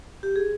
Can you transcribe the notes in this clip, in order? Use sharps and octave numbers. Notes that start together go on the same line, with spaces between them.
G4
G#4